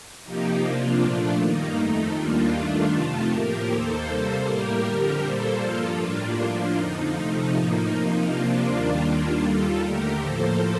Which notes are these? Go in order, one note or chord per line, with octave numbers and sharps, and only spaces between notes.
C3 F3 A#3 D#4 G4
C3 F3 A#3 D4 F4
A#2 F3 A3
G2 D#3 A#3 D#4
F2 D#3 A3
D#2 D#3 G3 A#3 D4 F4
G2 D#3 A3
F2 C3 D#3 A3 F4 A4
A2 F3 A#3 G4 A#4
D#2 D#3 A#3 A4 C5
C3 G3 A#3
A2 G3 A#3 G4 A#4
F2 D3 G3
A#2 G3 A#3 A4 C5
G2 F3 A#3 F4 A4
A2 G3 A#3 D4 F4
A2 F3 A#3
F2 D3 F3 D#4
C3 F3 A3
A2 F3 A#3
C3 F3 A#3 D#4
C3 F3 A#3 D4 F4
D#2 D#3 G3 A#3
D#2 D#3 G3 A#3
D#2 D#3 G3 F4 A4
D#2 D3 A3 G4 A#4
A2 F3 A#3 A4 C5